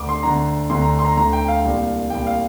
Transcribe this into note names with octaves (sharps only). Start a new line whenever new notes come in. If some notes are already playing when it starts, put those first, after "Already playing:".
Already playing: D2 D3 D6
C6
D2 D3 A#5
D2 D3 C6
A#5
C6
A#5
D2 D3 A#5
G5
F5
C2 A#2
C2 A#2 G5
F5